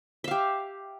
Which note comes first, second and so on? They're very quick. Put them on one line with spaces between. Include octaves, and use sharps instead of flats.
E5 F5 G4